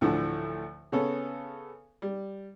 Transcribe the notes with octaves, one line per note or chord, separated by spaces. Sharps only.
D2 A2 D3 E3 F3
C#3 B3 C#4 A4
G3